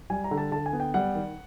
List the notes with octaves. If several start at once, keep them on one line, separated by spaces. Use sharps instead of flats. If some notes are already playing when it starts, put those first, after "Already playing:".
G3 G#5
A#5
D3
A5
D3 A5
G#5
B3
G5
G3 F#5
D#3